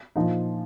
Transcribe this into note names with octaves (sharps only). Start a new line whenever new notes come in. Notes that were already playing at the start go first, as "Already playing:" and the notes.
A#2 F3 D#4 D#5